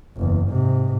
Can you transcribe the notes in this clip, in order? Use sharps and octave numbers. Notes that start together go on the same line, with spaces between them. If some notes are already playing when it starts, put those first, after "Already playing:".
F#1 E2
G#2 C3